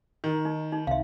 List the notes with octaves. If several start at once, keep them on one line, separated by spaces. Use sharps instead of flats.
D#3
D#4
D#4
C2 E5 F5